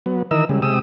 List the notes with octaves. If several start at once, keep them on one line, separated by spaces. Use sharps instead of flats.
F#3 B3
D#3 E3 A#4 D#5 E6
C#3 G3 G#3
C3 G#3 G4 D#6 E6